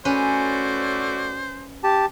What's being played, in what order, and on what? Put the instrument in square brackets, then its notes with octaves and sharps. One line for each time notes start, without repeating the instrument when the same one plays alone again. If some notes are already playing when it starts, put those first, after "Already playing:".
[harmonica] A3 F#4 D5 [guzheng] C#4 B4 [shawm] C5
[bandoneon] G4 A5